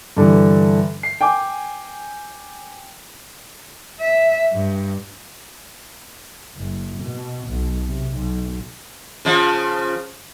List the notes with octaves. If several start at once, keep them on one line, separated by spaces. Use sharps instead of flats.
G2 D3 E3
C7
G5 G#5 D6
E5
G2
F#1
B2
B1
C3
B1
C#3 F3